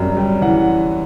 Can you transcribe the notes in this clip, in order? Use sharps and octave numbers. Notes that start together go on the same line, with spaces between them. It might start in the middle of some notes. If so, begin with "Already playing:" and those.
Already playing: F#2 G3
G3
E3 F#5